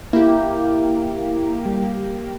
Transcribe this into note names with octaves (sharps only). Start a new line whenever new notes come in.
A#3 E4 G4
G3